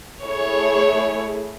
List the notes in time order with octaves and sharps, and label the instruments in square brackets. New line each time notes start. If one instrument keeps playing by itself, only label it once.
[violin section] A3 E4 G#4 C#5